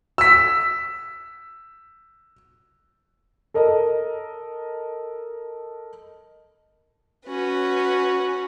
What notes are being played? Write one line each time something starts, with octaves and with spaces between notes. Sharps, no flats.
E6 B6
A4 A#4 D#5
C#4 F#4 B4